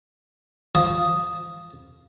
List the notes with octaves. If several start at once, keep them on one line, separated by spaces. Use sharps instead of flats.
F3 D#6